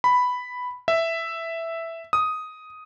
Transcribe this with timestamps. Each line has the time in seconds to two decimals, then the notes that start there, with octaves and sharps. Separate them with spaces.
0.04 B5
0.88 E5
2.13 D#6